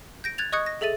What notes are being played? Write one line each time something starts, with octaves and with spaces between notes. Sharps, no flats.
G6 A#6 D7
F#6 G#6 A6 F7
D#5 C#6 D#6 F#6 G#6 C#7
A#6
G#4 A4 E5 A6 D#7